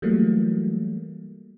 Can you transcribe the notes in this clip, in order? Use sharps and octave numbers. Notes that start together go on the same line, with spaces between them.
E3 F#3 G3 A3 A#3